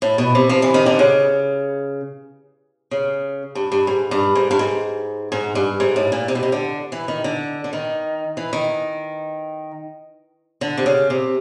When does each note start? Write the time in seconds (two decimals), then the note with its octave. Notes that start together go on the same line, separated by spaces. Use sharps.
0.02 A2
0.18 B2
0.35 C3
0.49 F3
0.62 E3
0.74 D#3
0.86 D3
0.99 C#3
2.91 C#3
3.55 G2
3.72 G2
3.87 G#2
4.11 G2
4.35 G#2
4.51 G2
4.59 G#2
5.32 G#2
5.55 G2
5.80 G#2
5.96 A2
6.12 A#2
6.28 C3
6.35 B2
6.43 C3
6.52 D3
6.92 E3
7.08 D#3
7.24 D3
7.64 D3
7.73 D#3
8.37 E3
8.53 D#3
10.61 D3
10.77 C3
10.86 C#3
11.10 C3